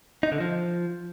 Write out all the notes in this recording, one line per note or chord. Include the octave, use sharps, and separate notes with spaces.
D#4
D3
F3